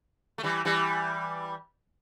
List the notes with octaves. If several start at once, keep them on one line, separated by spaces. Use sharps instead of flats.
A3
E3 G3
E3 G3